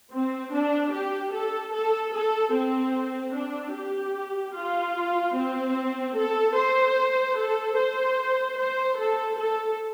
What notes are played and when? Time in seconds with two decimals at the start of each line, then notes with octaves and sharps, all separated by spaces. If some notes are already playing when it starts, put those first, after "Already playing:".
0.11 C4
0.52 D4
0.92 G4
1.32 A4
1.72 A4
2.13 A4
2.53 C4
3.33 D4
3.73 G4
4.55 F4
5.34 C4
6.16 A4
6.55 C5
7.37 A4
7.77 C5
8.57 C5
8.97 A4
9.38 A4